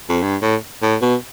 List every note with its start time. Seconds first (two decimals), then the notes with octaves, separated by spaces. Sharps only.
0.09 F2
0.23 G2
0.42 A2
0.82 A2
1.02 B2